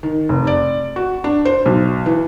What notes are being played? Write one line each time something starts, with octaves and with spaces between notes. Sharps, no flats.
D#3
F1
D5
F#4
D4
C5
B1
E3